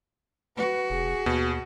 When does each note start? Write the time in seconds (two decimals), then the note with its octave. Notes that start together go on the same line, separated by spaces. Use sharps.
0.57 F#4 B4
0.90 F1 G#4
1.26 D#2 B2